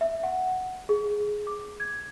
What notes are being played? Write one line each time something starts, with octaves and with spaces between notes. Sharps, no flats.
E5
F#5
G#4
D6
G#6